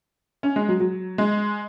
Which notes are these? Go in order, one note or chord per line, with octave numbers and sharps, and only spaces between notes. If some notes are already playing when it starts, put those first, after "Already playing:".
C#4
G#3
F#3
F#3
G#3